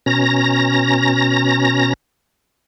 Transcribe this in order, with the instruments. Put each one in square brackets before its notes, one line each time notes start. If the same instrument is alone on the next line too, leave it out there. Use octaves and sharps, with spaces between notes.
[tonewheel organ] B2 C#4 A#5 A#6